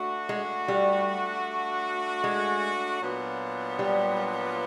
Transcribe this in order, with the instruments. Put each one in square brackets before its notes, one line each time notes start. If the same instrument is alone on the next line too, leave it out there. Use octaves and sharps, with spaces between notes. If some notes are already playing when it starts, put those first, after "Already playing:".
Already playing: [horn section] A3 D4 F#4
[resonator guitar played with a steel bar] G#3
G3
G#3
[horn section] A#2 F#3 B3 D4 F4
[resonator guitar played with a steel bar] G3